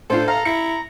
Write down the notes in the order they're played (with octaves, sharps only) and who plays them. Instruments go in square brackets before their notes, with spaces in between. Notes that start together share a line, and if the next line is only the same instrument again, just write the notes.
[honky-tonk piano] A2 D4 F4 [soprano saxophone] A4 [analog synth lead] C5
[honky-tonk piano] F5 [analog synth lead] A#5
[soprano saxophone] E4 [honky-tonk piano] C#7